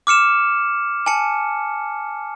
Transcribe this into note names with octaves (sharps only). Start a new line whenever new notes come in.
D6 F6 C#7 E7
G#5 A5 C#7